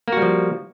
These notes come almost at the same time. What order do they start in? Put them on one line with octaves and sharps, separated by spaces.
A#3 F#4 G3 F3